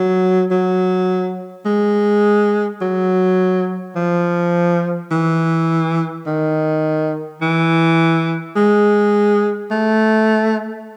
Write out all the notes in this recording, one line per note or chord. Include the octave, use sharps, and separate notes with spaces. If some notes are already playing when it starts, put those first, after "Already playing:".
Already playing: F#3
F#3
G#3
F#3
F3
E3
D#3
E3
G#3
A3